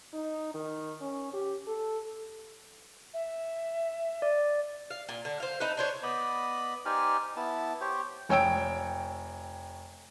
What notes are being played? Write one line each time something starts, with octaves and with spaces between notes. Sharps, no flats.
D#4
D#3
C#4
G4
A4
E5
D5
F5
A#2
D3
C5 F5
D#4 A4 B4
D4 C5 C#5
B3 D5 D#5 B5
D#4 G4 C5 D5 G#5 F6
B3 E4 A5
G4 C5 C#5
F1 C#5 G5 E6 D7